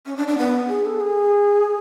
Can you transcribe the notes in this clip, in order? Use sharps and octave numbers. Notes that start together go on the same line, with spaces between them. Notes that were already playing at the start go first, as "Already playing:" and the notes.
C#4
D4
D4
B3
G#4
A4
G#4